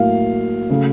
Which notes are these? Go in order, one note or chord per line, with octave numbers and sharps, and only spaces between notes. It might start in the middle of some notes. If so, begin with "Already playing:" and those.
Already playing: A2 F#3 A#3 F5
C#3 F#3 A3